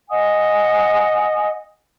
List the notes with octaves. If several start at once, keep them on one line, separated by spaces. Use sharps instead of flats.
D#5 F#5 G#5 D#6